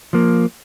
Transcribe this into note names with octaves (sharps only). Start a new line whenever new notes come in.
F3 A#3